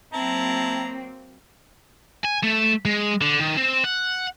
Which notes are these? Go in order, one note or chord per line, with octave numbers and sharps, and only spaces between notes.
F#3 A#3 C4 E4 A5 A#5
G#5
A3
G#3
D3
D#3
C4
F#5